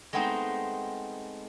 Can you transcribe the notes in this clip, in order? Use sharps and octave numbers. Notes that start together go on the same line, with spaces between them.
G#3 A3 B3 C4 D#4